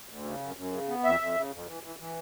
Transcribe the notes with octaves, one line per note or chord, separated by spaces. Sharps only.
D2
C#3
F#2
F#2
C#3
B3
F2 E5
F2
C#3
F2
E3
E3
E3